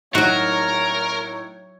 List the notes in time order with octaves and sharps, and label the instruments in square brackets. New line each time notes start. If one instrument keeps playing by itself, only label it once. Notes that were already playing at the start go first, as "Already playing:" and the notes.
[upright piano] A2 D#4 [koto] F#3 F#4 [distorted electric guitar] A#4 [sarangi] C#5